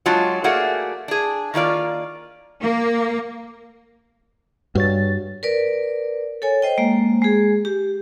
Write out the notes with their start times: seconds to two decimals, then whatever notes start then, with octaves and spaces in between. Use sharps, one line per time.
0.06 F#3 G#3 D4 F4
0.44 A3 A#3 F#4 G#4 D5 F#5
1.08 D4 G#4
1.54 D#3 A#3 F4 D5
2.63 A#3
4.75 G2 F#4 C#5 A6
5.43 A#4 B4 D5
6.42 A4 C#5 G#5
6.62 C5 D#5 G5
6.78 G#3 A#3
7.22 G#3 G#4
7.65 G4